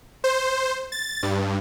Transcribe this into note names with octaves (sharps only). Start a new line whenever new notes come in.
C5
A6
G2